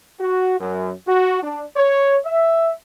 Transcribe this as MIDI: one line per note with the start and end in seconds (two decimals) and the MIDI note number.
0.20 0.58 66
0.60 0.91 42
1.08 1.42 66
1.43 1.64 62
1.76 2.17 73
2.25 2.71 76